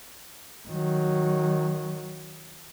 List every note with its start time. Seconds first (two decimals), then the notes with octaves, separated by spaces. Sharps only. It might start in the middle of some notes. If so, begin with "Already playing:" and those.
0.68 D#3 F#3